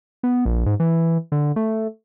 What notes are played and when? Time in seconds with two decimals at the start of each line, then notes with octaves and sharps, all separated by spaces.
0.23 B3
0.45 A#1
0.66 G#2
0.80 E3
1.32 D3
1.56 A3